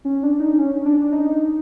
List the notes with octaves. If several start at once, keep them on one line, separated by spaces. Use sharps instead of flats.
C#4
D4
D#4
C#4
D4
D4
D#4